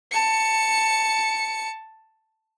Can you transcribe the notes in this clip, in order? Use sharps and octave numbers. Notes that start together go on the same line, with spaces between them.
A5 C#7